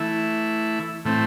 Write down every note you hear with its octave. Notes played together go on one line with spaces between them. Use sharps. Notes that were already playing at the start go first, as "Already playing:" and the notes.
Already playing: E3 A3 E4
A2 E3 A3 C4